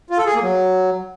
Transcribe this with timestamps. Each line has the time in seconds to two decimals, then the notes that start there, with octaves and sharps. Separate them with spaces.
0.10 F4
0.18 A4
0.26 G#4
0.34 A#3
0.42 F#3